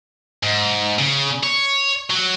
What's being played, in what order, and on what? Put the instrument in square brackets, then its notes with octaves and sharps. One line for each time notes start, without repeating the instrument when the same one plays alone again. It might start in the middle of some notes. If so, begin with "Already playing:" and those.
[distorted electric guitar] G#2
C#3
C#5
F#3